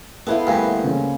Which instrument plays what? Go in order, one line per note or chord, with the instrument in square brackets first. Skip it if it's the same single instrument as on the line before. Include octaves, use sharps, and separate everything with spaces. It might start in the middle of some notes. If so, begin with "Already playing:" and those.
[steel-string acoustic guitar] B3 E4 C5 [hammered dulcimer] A4 B4 F5
[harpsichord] D2 G2 [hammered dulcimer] A#3 [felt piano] G5 G#5
[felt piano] C#3 C4 C#4